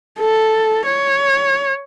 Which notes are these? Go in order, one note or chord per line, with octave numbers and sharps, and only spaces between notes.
A4
C#5